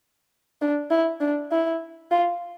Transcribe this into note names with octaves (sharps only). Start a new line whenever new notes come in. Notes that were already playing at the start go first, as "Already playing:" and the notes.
D4
E4
D4
E4
F4